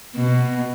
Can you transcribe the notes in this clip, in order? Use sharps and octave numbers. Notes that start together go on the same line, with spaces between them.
B2